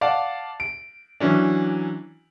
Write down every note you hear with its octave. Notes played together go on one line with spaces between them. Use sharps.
D5 F5 F#5 A5
D7
E3 F#3 C#4 D4